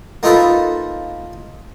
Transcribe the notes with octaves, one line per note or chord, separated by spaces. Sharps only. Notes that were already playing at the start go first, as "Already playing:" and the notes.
A#3 D#4 F4 A4 B4